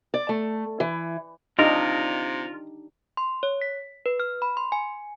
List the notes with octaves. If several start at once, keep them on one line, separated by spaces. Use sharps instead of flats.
D5
A3
E3
C3 D4 D#4 F4 G4 A#4 D#5
C6
C#5
B6
B4
F6
B5
C6
G#5